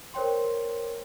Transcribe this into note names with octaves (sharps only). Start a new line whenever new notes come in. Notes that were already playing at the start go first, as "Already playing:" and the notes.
A#4 C5 C#5 G5 C6